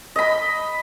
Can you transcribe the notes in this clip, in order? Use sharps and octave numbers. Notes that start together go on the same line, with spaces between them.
D#5 B5